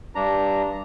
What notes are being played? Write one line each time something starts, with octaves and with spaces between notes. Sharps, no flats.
G2 D4 A#5